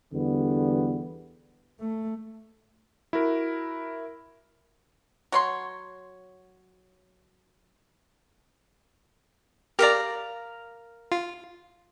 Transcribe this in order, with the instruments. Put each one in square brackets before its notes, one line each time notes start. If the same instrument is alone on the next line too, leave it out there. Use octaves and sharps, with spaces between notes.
[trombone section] E2 D3 G3 B3
[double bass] A3
[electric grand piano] E4 F#4 A#4
[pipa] F#3 C#5 C6
[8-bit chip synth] G4 D5 [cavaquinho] A#4 F5 A#5
[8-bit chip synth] F4